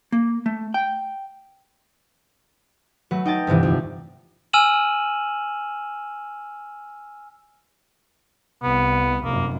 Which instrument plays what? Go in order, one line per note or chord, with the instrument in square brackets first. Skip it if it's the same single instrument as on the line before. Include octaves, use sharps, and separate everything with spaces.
[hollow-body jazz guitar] A#3
A3
G5
[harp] F#3 A3 B4
D#4 G5 A5 A6
D2 G2 C3 E3
F2
[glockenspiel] G#5 E6 F6 D#7 E7 F#7
[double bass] C2 [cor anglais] B3
[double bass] F1 F#2 [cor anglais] A#3